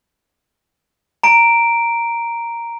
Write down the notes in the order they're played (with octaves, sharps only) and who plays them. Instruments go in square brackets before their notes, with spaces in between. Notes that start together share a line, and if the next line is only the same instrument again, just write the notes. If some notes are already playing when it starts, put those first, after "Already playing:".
[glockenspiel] A#5 D7